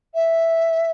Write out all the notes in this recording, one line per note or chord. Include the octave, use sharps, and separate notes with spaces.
E5